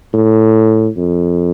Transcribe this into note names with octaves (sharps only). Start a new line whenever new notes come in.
A2
F2